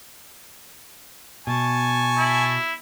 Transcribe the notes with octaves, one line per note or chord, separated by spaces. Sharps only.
B2 G#5 A5 C#6
E4